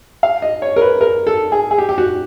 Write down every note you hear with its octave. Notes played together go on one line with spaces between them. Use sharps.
F5
D#5
C#5
A#4
B4
A#4
A4
G#4
G#4
G4
G4
F#4